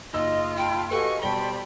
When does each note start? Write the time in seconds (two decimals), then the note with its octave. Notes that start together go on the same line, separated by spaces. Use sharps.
0.13 F#1 D#4 F4 D#5 D#6 E6
0.57 G5 A5 B5
0.91 F#4 G4 A4 B4 D#5 F5 G#5 C#6
1.22 B2 G3 C5 D5 G5 A5 B5 G7